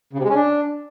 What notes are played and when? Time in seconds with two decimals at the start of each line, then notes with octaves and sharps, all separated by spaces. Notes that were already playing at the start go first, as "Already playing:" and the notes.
0.13 C#3
0.19 C3
0.24 G#3
0.29 C#4
0.35 D4